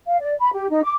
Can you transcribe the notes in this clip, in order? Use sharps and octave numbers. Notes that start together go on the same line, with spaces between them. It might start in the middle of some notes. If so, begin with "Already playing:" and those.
F5
D5
B5
G4
D#4
D6